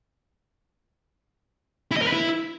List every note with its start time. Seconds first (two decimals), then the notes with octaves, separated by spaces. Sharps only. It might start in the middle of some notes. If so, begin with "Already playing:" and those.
1.91 E4
1.97 D#5
2.02 A#4
2.07 B4
2.13 E4